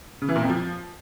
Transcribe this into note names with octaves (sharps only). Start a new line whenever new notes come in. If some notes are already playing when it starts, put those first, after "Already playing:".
C#3
E3
A#2
F2
F3